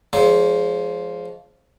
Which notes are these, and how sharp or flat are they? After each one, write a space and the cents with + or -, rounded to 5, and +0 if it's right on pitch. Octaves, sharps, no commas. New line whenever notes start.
F3 +0 G#3 +15 C#5 +40